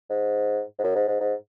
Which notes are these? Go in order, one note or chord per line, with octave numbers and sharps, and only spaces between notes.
G#2
G#2
F#2
G#2
G#2
G#2